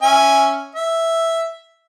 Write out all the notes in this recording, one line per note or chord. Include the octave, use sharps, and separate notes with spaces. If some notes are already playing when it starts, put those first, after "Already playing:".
C#4 E5 G#5
E5